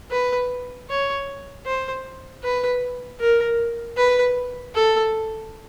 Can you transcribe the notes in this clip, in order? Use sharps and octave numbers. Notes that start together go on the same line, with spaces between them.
B4
C#5
C5
B4
A#4
B4
A4